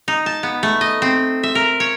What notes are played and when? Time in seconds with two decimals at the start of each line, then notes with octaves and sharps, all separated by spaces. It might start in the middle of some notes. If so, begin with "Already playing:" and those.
0.08 D#4
0.26 A5
0.43 B3
0.63 A3
0.81 D#5
1.02 C4
1.43 E5
1.55 A#4
1.80 C#5